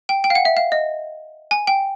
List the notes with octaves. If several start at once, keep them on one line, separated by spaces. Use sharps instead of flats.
G5
G5
F5
F#5
E5
F5
D#5
G#5
G5